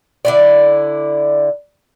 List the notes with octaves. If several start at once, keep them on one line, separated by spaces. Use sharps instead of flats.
D3 E4 D5